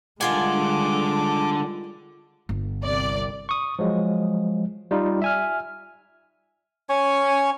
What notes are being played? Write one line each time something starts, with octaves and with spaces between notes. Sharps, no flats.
D3 D#3 G3 G#3 F4 F#5 G#5 D6
G1
C2 D5
C#6 D#6
F3 F#3 G#3
G3 D#4 F4
E5 G#5 F6
C#4 C#5 G#5 C#6